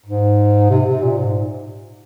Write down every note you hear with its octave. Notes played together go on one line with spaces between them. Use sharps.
G#2
C3
C3
A#2
G#2